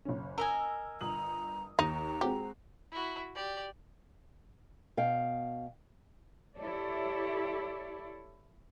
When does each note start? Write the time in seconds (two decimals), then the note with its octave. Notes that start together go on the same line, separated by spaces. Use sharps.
0.05 F#1 C#4
0.38 A#4 D#5 G#5 E6
1.01 G1 A#5 D#6 F#7
1.79 D#2 D#4 A#5
2.21 G#3 C4 F#4 G4
2.92 E4 F#4
3.35 G4 D5
4.97 B2 F5 G5
6.59 E4 G4 A4 C#5 D5